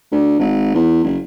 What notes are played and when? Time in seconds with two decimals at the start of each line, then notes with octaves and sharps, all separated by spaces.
0.11 D2
0.39 G#1
0.74 E2
1.04 F#1